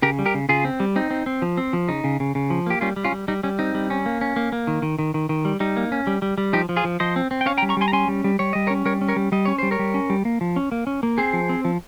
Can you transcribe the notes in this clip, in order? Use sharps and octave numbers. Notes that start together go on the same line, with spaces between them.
C#3 G4 A#4
G3
G4 A#4
C#3
C#3 F4 G#4
C4
G3
C4 D#4
C4
C4
F3
C4
F3
C#3 D#4
C#3
C#3
C#3
F3
A#3 G4
G3 C#4 F4
G3
C#4 F4
G3
G3 D#4
G3 C#4
C4 D#4
G3
C#4
A#3
C#4
A#3
A#3
D#3
D#3
D#3
D#3
D#3
G3
G3 D#4
A#3
C#4
G3
G3
G3
F3 D#4 G4
F3
F4 G#4
F3
F3 C5 D#5
C4
C4
G5
C#4 C#5 F5
G5 A#5
G3
A#5 C#6
G3 G#5 C6
A#5
C#4 G#5 C6
G3
G3
G3 C#5
G3 D#5
A#4 C#5
C#4
G3 A#4 C#5
C#4
A#4 C#5
G3
G3 D#5
C#4 C#5
G3 C5
A#4 C#5
G3
C#4
G3
A#3
F3
C#4
A#3
C#4
A#3
C4 G#4 C5
F3
C4
F3